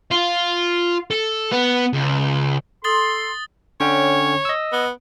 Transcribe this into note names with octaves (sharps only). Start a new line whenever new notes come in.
F4
A4
B3
C#2
A4 C6 D#6 A6 G7
D3 C#4 C#5 G5
D#5 E6
B3